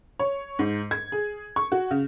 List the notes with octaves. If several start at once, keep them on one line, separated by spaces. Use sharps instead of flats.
C#5
G#2
G#6
G#4
C#6
F#4
C#3